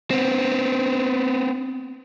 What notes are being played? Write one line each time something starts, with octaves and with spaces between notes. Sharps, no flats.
B3 C4